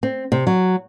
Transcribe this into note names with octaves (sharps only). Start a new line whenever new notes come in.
C4
C3
F#3